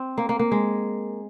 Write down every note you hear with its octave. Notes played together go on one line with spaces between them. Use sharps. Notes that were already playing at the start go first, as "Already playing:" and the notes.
Already playing: C4
A#3
A#3
A#3
G#3